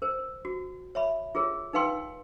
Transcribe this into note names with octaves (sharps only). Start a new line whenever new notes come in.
A#4 C5
F#4
C#5 E5 B5
F4 G#4 A#4 C#5
D#4 A#4 B4 F5 G5 C6